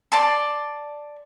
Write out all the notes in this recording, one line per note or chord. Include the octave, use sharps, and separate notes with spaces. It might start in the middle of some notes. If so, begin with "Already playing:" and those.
D5 A5 C6